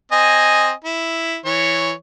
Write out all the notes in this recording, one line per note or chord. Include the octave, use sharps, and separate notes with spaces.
C4 D#5 G#5
E4
E3 C#5